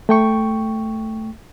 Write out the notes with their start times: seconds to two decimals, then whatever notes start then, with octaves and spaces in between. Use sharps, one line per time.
0.09 A3 G5 C#6